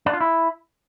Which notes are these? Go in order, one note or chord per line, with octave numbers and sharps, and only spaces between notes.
D4
F4
E4